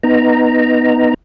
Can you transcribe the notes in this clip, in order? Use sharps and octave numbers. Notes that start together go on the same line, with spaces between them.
B3 D#4 A#5